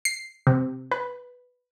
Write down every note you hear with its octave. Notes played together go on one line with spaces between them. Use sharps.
C7
C3
B4